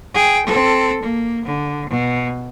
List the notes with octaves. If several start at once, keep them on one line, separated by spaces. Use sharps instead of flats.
G#4 G5
C4 A4
A#3
D3
B2